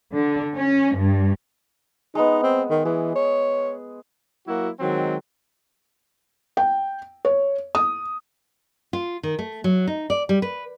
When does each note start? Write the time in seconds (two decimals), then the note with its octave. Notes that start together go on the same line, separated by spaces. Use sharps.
0.14 D3
0.56 C#4
0.96 G2
2.15 G#3 B3 D#4
2.43 C4
2.70 D#3
2.85 E3 G#4
3.16 C#5
4.48 F#3 A#3 E4 F#4
4.80 D#3 F#3 G#3 C4
6.57 G5
7.25 C#5
7.75 D#6
8.93 F4
9.23 D#3
9.39 A3
9.64 F#3
9.87 D#4
10.10 D5
10.29 G3
10.42 B4